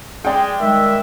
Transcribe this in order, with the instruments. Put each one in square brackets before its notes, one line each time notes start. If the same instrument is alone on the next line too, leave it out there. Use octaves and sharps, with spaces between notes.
[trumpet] G#3 [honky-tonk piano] D5 G5
[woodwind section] D#3 G3 G#3 [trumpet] E5